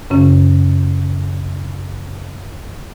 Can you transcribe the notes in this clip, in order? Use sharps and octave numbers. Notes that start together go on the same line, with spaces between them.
F#2 C#3 C#4